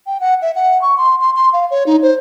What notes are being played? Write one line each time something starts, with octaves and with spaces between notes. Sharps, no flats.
G5
F#5
E5
F#5
C#6
C6
C6
C6
F5
C#5
D#4
C5